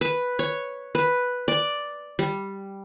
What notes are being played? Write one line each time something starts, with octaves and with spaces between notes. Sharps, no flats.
B4
C#5
B4
D5
G3